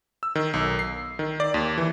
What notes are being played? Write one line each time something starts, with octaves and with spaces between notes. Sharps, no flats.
E6
D#3
B1
C7
D#3
D5
D#2
E3